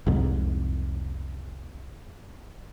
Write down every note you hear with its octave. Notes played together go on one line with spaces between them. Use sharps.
C2 F2 G#2 C3